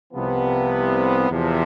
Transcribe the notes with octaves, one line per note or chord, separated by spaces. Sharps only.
C2 C3 F3 B3
E2 C3 F3